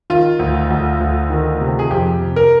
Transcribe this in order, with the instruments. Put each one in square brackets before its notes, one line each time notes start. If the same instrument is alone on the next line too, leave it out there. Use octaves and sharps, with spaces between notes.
[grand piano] D#3 F4
D2
D2
D2
D#3
C3
G#4
F2 G4
C3
A#4